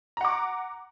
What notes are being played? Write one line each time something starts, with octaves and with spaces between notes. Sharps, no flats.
F#5 A#5 D6